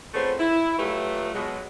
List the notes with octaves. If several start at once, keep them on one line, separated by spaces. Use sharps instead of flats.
F2 A3 B3 C#4 G#4 C5
E4
F3 F#3 A3 F4 G4 B4
B2 F#3 G#3